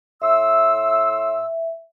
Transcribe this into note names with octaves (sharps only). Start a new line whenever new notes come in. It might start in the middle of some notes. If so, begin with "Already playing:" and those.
A2 E5 C6 E6